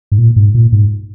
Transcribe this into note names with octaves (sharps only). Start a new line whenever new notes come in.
G#2
A#2
G#2
A#2
G#2